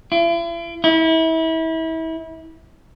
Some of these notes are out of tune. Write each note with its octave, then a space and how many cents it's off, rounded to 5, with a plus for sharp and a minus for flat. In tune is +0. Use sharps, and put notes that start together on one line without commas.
E4 +45
E4 -30